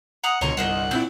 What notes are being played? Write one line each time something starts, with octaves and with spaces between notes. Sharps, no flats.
F#5 A#5 D#6
C#2 B2 D3 C#5 D#5 A#5 C6
G1 C2 A#4 C5 D#5 F#5
A#2 A3 C4 D4 E4 G6